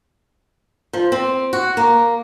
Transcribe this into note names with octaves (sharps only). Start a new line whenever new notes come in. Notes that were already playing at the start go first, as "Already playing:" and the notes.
F3
C4
F#4
A#3